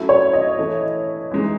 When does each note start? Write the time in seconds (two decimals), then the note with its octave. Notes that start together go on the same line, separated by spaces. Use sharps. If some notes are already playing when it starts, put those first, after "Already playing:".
Already playing: F#3 A3 C#4 E4
0.09 C#5
0.33 D#5
0.58 E3 A3 E4
1.32 E3 G#3 D#4